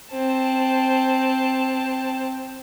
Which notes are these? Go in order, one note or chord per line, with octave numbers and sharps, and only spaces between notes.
C4 A5